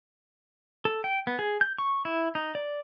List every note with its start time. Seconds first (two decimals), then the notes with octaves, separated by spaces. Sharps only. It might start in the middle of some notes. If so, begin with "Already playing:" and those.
0.85 A4
1.04 G5
1.27 B3
1.39 G#4
1.61 G6
1.78 C#6
2.05 E4
2.35 D#4
2.55 D5